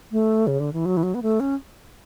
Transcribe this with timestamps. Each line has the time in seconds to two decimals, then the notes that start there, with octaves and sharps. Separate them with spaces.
0.12 A3
0.47 C#3
0.60 D3
0.73 E3
0.86 F#3
0.97 E3
1.03 F#3
1.15 B3
1.23 A3
1.40 C#4